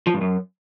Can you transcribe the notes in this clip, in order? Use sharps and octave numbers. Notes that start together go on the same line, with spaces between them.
F3
G2
F#2